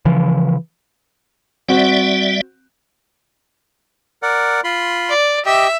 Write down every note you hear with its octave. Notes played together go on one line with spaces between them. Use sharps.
C#3 E3 F3
G3 C4 F#4 D5 E5
A#4 D5 F#5
F4 B5 C6
D5
G4 D#5 E5 G5